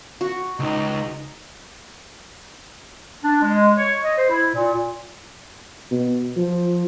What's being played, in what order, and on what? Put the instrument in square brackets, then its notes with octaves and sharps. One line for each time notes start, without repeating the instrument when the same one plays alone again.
[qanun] F#4
[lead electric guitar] C#2 [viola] D#4
[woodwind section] D4
G#3
C#5
D#5
C5
E4
A#2
[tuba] B2
F3